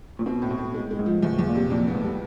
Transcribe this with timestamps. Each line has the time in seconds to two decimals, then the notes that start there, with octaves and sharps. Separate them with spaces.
0.19 A#2
0.26 B2 C4
0.42 A2
0.51 B2
0.58 A2
0.74 G#3
0.91 G#3
0.99 G#2
1.06 F3
1.23 E2 A2
1.39 E2
1.47 A#2
1.55 C3
1.70 F2 A#2
1.87 G#2 B3
1.95 A2
2.03 G3